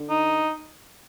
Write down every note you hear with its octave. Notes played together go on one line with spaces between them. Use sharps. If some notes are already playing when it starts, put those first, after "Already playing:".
Already playing: D3
D#4